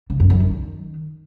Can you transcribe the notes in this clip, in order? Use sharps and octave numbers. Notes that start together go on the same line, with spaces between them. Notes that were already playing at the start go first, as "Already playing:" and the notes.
C#3
F#2
F#2
D#3